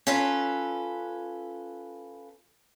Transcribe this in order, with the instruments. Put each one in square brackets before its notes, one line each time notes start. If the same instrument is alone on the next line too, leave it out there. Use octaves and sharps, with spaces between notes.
[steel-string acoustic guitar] C#4 F4 A4 B4